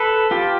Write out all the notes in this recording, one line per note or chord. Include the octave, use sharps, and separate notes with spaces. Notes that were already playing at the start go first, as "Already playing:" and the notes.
Already playing: A4 B4
F4 G4